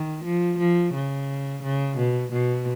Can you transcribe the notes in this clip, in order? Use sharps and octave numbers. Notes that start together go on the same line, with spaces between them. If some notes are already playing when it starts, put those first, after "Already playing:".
Already playing: D#3
F3
F3
C#3
C#3
B2
B2